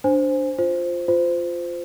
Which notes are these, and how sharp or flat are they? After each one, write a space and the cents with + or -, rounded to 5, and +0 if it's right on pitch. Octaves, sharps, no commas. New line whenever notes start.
D4 +0 C5 +0 G#5 -5
F4 +0 C5 +0
F4 +0 C5 -20